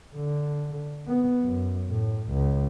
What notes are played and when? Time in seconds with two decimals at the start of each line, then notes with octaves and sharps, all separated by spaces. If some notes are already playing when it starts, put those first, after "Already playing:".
0.15 D3
1.07 B3
1.42 F#2
1.89 A2
2.32 C#2